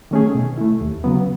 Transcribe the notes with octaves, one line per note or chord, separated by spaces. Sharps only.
D#3 A3 C#4 G#4
B2
A3 E4
D#2
C#3 F#3 B3